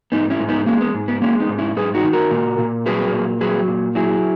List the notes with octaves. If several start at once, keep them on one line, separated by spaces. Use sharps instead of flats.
G#2 B3 D#4
C#4 E4
G#2
B3 D#4
G#3 A#3 C#4
B3
G#2
B3
G#3 A#3 C#4
B3 D#4
G#2
C#4 E4
G#2 G#4 B4
D#4 F#4
D#3
F#4 A#4
A#2
A#2
F#3 G#4 B4
A#2
F#3 G#4 B4
A#2
F#3 E4 G#4